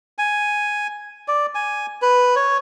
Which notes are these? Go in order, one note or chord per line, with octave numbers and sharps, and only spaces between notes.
G#5
D5
G#5
B4
C#5